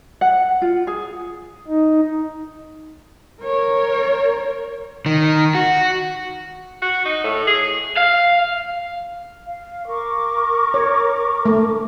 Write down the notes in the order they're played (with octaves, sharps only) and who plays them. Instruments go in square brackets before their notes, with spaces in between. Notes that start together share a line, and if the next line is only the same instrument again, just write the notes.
[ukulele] F#5
F4
G#4
[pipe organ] D#4
[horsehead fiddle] A#4 C#5
[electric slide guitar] D#3
F#4
[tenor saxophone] F#4
D#4
A2
G#4
[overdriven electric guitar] F5
[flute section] F5
A#4 C#6 D6
[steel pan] C#5
A3